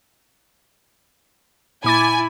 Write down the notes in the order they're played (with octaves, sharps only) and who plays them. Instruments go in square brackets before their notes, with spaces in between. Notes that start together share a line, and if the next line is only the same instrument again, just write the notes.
[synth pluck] A#2 D6 A6 [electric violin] E4 [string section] G#5 [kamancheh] B5